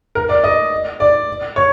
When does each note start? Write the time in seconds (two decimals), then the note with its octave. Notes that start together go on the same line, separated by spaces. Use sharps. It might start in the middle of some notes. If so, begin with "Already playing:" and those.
0.15 A#4
0.29 D5
0.44 D#5
1.00 D5
1.56 C#5